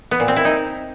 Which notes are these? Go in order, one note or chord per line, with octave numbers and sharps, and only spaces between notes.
B3
A#2
C4
E4
D#4